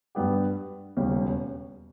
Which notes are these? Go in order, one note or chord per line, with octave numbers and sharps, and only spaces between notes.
G2 G3 B3 G4
E1 D#2 C#3 G3 C#4